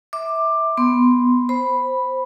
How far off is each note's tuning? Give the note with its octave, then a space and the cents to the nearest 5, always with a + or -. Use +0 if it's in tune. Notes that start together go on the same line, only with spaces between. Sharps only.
E5 -20 D6 +15
B3 +0 C6 +0
C5 +0 B5 +0